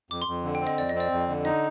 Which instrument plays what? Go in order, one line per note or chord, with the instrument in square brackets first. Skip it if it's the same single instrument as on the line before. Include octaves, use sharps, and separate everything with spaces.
[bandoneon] F2 [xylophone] D6
[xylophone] C6
[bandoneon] F2
D3
[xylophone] G5
[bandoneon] C4
[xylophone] D#5
[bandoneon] F2 [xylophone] D5
[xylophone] D#5
[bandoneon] C4
[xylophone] D5
[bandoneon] F2
D3
[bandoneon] D#4 [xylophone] D#5